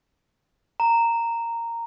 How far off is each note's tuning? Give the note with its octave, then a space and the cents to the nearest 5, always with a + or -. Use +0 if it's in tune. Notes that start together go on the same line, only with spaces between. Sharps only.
A#5 -10